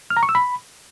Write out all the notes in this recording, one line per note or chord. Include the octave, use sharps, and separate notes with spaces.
F6
A#5
C#6
E6
B5